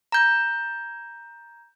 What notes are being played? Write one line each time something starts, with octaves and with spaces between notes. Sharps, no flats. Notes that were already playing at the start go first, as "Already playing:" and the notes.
A#5 G6